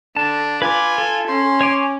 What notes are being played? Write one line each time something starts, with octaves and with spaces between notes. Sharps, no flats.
D3 D4 A5
F4 B4 G#5 D6
A4
C#4 C6
C#5 G#5 D6